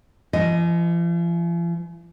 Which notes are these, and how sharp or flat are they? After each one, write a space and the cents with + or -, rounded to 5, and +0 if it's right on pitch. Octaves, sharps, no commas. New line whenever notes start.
F3 -45 D#5 +0